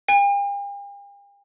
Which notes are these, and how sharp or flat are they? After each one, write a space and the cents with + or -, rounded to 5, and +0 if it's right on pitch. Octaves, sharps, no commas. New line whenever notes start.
G5 +45